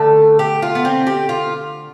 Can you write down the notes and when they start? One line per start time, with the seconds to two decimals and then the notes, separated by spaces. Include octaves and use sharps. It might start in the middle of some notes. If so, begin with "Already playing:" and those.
Already playing: D3 A3 A4
0.39 G4
0.62 F4
0.75 B3
0.85 C4
1.07 G4
1.29 F4